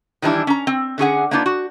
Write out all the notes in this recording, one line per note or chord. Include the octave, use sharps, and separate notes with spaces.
D#3 E3 G3 D4 E4
C#4 A#5
C4
D3 C#4 G#4 F#5
A#3 B3 D4 D#4 F4
F#4